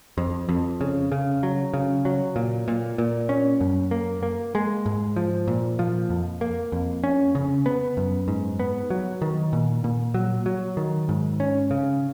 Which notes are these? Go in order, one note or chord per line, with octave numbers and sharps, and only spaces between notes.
F2
F2
C#3
C#3
F#3
C#3
F#3
A#2
A#2
A#2
C#4
F#2
A#3
A#3
G#3
G#2
F3
A#2
F3
F2
A#3
F2
C#4
C#3
B3
F#2
G#2
B3
F#3
D#3
A#2
A#2
F#3
F#3
D#3
G#2
C#4
C#3